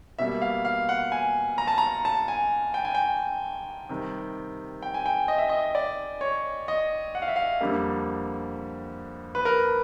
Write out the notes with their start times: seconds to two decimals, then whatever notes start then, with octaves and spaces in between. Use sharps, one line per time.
0.19 B2 G3 A#3 E5
0.42 F5
0.65 F5
0.89 F#5
1.12 G#5
1.58 A#5
1.67 A5
1.78 A#5
2.05 A5
2.28 G#5
2.74 G5
2.85 G#5
2.95 G5
3.89 C3 D#3 G3
4.82 G5
4.94 G#5
5.06 G5
5.28 D#5
5.38 E5
5.49 D#5
5.75 D5
6.21 C#5
6.68 D#5
7.15 F#5
7.22 F5
7.28 E5
7.36 F5
7.61 F2 D3 G3 A#3
9.35 B4
9.45 A#4